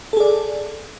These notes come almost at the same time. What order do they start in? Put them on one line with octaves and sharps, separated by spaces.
A4 G#4 D5